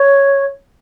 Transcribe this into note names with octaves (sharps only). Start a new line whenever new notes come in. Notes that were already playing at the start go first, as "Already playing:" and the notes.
Already playing: C#5